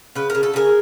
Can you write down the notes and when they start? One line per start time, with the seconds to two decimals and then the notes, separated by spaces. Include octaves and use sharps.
0.15 C#3 B4
0.30 C#3 A#4
0.43 A4
0.54 C#3 G#4 A#4